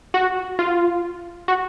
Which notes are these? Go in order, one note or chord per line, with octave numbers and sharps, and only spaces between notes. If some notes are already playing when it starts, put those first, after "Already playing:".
F#4
F4
F#4